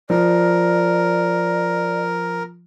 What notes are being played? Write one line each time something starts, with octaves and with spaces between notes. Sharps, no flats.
F3 A#4 D5